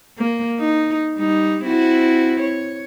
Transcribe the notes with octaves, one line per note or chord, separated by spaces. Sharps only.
A#3
D#4
G3 D#4
C4 E4 F#4
C#5